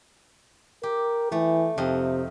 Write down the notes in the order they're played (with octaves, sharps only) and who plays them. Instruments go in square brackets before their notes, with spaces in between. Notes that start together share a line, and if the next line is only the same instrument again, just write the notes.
[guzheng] G4 [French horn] A#4
[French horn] E3 [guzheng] A3
[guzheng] F2 D#4 [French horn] C3